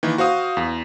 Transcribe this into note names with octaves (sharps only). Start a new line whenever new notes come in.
D#3 E3 A#3
F#4 C5 F5 D#6
E2